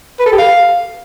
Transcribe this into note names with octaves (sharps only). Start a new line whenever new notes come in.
B4
A4
G4
F5